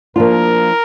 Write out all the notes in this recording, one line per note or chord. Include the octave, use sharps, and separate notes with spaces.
F3 A#3 D4 F4 A#4